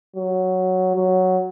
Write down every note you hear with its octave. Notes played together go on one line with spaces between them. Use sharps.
F#3
F#3